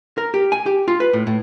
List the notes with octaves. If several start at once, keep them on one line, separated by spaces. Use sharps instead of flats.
A#4
G4
G#5
G4
F4
B4
A2
A2